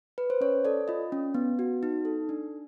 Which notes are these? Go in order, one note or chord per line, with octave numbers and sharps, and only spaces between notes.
B4
C5
C#4 C#5
A4 D5
F4 D#5
C#4
B3
F#4
D#4
A4
D4